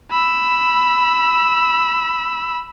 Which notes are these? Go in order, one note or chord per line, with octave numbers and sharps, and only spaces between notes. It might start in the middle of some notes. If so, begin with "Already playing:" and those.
B5 E6